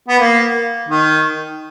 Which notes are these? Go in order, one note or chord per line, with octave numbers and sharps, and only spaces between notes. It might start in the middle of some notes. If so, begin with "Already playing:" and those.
B3
A#3
D#3